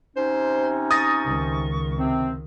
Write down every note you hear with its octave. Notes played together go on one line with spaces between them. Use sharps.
C3 C#4 D#4 C5
C#6 D#6 A6 A#6
C#2 D#3
C3 C4